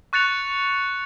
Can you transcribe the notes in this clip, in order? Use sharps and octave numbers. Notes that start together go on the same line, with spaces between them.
C#6 F#6 A6 C#7 F7